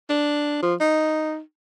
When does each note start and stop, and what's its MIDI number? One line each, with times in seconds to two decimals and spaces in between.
0.10 0.60 62
0.62 0.74 53
0.81 1.40 63